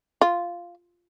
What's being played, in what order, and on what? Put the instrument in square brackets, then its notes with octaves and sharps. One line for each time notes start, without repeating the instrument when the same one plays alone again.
[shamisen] F4